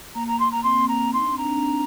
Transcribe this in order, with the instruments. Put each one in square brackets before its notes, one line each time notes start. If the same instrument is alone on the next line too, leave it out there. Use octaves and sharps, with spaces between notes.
[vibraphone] A#3 [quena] A#5
[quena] A#5
C6
[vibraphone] A#3 [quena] A#5
[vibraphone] C4 [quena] C6
[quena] A#5
[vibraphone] D#4 [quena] C6
[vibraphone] D4
C4
[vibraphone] D4 [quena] A#5